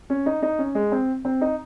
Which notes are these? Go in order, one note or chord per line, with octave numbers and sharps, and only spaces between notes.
C#4
D#4
D#4
C#4
G#3
C4
C4
D#4